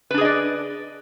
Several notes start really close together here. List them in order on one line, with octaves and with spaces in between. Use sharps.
B4 D4 G#4 D#5 D5